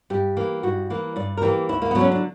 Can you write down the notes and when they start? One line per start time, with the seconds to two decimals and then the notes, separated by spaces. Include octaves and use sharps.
0.10 G2 G4
0.37 E3 A#3
0.63 G2 F#4
0.90 E3 A#3
1.16 G2 D5
1.37 A#4
1.42 E3 A#3 G4
1.69 D2 E4
1.82 A#3
1.91 D3 F#3 B3
2.01 C#4
2.12 D4